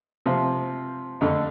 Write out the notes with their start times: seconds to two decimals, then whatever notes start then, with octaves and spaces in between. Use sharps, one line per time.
0.26 C3 F3 C4
1.21 F2 D3 A3